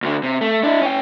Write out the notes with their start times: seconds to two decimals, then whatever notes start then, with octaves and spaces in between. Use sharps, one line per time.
0.03 D2 D3
0.23 C3
0.41 A3
0.63 D4 E4
0.82 C#4 G5